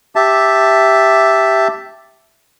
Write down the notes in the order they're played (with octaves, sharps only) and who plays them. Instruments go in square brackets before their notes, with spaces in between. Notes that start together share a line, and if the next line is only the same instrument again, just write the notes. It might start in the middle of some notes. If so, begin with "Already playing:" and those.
[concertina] G4 E5 A5